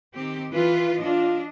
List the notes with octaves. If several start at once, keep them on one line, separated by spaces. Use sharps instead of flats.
D#3 C4 G4
E3 F4 B4
D4 F4 D#5